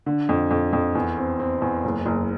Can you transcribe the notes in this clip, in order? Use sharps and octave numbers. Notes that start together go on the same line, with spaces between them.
D3
F2
F2
F2
E2
C4
C4
E2
F#1
F#1